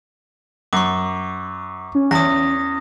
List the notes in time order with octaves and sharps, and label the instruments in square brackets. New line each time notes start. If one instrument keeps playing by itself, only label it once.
[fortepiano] F#2 [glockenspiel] C#6 D6
[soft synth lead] C#4
[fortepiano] E2 [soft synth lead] C#4 [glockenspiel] D#6 A#6